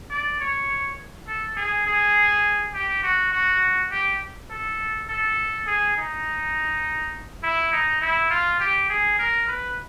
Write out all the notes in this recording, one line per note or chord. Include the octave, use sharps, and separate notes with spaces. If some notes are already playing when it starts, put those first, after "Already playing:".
D5
C#5
A4
G#4
G#4
G4
F#4
F#4
G4
A4
A4
G#4
D#4
E4
D#4
E4
F4
G4
G#4
A#4
B4